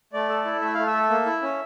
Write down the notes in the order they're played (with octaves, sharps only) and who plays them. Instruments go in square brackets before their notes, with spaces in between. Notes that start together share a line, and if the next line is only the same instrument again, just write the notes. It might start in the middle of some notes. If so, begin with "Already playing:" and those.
[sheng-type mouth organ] A3 D5
A4
E4
A3 E5
A3 F5
E5
A4
A#3
E4
C#4